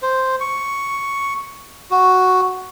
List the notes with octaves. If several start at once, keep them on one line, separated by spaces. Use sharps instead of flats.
C5
C#6
F#4